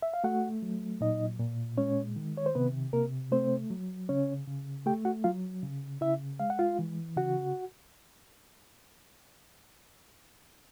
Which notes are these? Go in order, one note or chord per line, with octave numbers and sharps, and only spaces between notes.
E5
F5
A3 F#4 F#5
F#3
A#2 D#4 D#5
A#2
G#3 C#4 C#5
D#3
C#5
C5
C3 B3 B4
C3 A#3 A#4
A3 C4 C5
F#3
C#3 C#4 C#5
C#3
A3 G4 G5
F#4 F#5
F#3 F4 F5
C#3
C#3 E4 E5
G#3 F5
F#5
F4 F5
E3
C#3 F#4 F#5